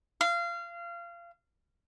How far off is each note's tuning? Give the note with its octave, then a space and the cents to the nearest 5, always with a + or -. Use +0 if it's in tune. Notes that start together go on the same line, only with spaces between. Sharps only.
F5 -25